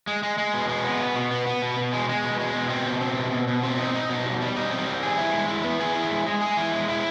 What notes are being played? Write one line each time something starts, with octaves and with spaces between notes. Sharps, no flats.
G#3
G#3
G#3
B2
G#3
B3
B2
B2
B3
B3
B2
B2
G#3
G#3
B2
G#3
B2
C4
B2
C4
B2
B2
B2
C4
D#4
D#4
B2
G3
G3
D#4
C4
G3
G#4
E4
G#3
E4
B3
G#4
E4
G#3
G#3
G#4
E4
G#3
E4